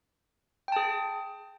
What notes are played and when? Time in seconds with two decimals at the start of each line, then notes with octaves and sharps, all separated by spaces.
0.68 G5
0.72 A5
0.76 G#4